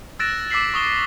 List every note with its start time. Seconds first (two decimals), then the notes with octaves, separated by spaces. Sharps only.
0.19 E6 F#6 A6 A#6 D7 E7
0.50 D6 E6 A6 B6 C7 F#7
0.74 C#6 D#6 G7